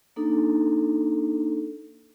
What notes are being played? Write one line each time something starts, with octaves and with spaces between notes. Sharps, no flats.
A#3 D4 D#4 A4